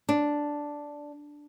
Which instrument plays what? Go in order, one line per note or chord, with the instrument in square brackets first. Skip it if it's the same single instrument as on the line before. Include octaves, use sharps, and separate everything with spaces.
[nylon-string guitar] D4